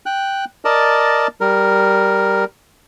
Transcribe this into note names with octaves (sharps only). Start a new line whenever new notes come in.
G5 F#6
A#4 D5 D#5 A5
G3 A#4